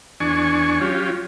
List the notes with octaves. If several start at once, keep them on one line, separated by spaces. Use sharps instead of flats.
E2 D4 G#5 C#6
F#3 C#4 F4 G4